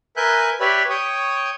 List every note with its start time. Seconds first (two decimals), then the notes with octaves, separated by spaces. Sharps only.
0.17 A#4 B4 E5 G#5 F#6 G6
0.60 G4 B4 C#5 D5 E5 B5
0.90 C#5 G5 C#6 D#6